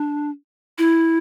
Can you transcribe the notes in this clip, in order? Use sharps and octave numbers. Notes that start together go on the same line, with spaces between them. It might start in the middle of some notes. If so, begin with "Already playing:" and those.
Already playing: D4
E4